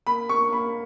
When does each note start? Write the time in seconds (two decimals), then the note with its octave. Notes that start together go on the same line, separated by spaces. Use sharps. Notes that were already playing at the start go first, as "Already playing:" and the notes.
0.07 A#3 B5
0.29 A#3 C#6
0.53 A#3 B5